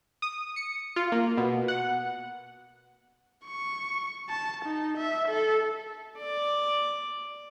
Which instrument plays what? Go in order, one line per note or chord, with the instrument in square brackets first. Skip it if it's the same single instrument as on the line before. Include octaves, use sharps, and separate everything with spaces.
[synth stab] D#6
C#7
F4
A#3
B2
F#5
[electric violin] C#6
A5
D#4
E5
A4
[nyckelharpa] D5